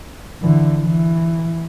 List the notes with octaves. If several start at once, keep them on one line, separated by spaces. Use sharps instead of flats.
D3 E3
E3